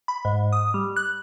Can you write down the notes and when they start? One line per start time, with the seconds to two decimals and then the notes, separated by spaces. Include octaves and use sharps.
0.08 B5
0.25 G#2
0.52 D#6
0.74 G3
0.96 F#6